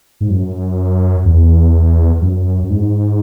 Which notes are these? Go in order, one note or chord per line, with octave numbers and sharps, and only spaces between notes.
G#2
F#2
E2
F#2
F#2
G#2